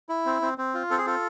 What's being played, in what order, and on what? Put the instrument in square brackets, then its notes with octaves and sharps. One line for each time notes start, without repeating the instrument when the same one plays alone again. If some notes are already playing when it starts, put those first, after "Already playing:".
[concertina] E4
C4
C4
C4
F4
C4 A4
G#4
F4 A4